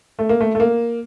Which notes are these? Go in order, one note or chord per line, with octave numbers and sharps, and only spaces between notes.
A3
A#3
A3
A3
A#3